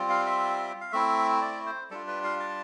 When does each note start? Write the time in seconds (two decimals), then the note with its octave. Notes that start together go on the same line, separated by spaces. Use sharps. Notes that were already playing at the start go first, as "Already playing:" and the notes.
Already playing: G3 C4 F4
0.09 F5
0.26 E5
0.81 F5
0.92 A3 C4 E4 E5
1.42 D5
1.66 C5
1.90 G3 D4 F4 A4
2.08 B4
2.24 F5
2.40 A5